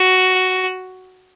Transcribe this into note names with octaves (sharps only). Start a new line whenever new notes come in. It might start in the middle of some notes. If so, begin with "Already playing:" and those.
Already playing: F#4